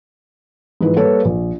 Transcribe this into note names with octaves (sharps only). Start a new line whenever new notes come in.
G#2 E3 F3 B4
G3 A#3 A4 B4 C#5
A#1